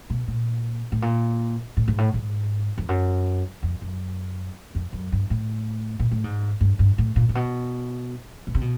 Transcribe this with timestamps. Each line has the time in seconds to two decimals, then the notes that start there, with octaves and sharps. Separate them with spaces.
0.10 B2
0.28 A#2
0.92 A2
1.02 A#2
1.77 A2
1.88 G#2
1.98 A2
2.14 G#2
2.78 F2
2.89 F#2
3.63 F2
3.82 F#2
4.75 F2
4.93 F#2
5.12 G2
5.30 A2
6.00 A#2
6.12 A2
6.24 G#2
6.61 G2
6.79 G2
6.98 A2
7.16 A#2
7.29 A#2
7.35 B2
8.47 B2
8.55 C3
8.61 B2